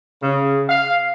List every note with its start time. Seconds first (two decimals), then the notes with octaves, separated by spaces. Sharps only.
0.23 C#3
0.69 F5